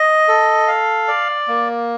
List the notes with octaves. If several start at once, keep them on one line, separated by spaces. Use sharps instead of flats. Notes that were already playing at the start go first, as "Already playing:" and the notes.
Already playing: D#5
A4
F5
D5
A#3